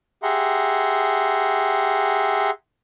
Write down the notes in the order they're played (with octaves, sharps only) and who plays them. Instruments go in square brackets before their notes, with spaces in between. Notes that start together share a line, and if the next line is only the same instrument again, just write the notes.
[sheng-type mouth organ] G4 G#4 E5 F#5 A#5 C6